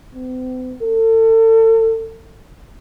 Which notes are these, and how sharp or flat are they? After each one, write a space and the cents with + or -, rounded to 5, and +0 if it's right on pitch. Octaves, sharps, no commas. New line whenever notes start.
C4 -45
A4 +35